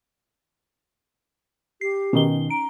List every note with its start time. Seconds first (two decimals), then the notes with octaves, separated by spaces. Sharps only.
1.81 G4 C7
2.13 B2 D#3 C#4 D#4 G7
2.50 A#5 D7